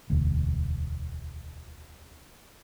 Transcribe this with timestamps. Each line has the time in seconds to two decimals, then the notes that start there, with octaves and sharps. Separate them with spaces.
0.10 E1 D2